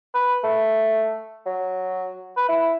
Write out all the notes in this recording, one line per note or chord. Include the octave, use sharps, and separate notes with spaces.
B4
A3
F#3
B4
E4